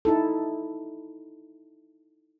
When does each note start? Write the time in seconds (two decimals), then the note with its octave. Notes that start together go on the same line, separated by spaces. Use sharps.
0.05 D#4 E4 A4